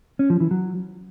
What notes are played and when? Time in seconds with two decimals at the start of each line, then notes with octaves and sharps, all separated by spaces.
0.19 C#4
0.30 F3
0.40 E3
0.51 F#3